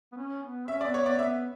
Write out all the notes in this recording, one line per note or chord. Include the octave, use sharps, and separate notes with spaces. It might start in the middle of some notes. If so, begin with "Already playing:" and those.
B3
C#4
B3
C#4 E5
D5
B3
C#5
B3 D5
B3 E5